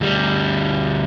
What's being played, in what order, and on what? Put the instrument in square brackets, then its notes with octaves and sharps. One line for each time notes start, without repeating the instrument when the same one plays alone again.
[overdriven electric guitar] D2 G3